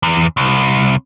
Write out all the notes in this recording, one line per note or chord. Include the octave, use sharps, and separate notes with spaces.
E2
C2